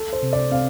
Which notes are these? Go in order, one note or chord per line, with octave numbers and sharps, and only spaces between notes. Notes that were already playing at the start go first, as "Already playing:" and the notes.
Already playing: A4
C5
C3
D5
C4 F5